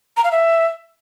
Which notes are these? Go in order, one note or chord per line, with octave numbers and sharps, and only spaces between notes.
A#5
F5
E5